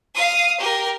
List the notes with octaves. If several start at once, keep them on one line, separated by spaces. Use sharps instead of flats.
F5 D#6
G4 A#4